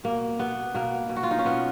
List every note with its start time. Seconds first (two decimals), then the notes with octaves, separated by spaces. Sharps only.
0.04 B2 A#3
0.39 B2 B3
0.74 B2 A#3
1.09 B2
1.16 F#4
1.23 F4
1.31 D#4
1.39 C#4
1.45 B2 B3